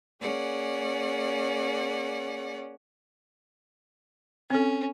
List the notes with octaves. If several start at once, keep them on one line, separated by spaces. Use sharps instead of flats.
A#3 C#4 G#4 D5 F#5
C4 C#4 A4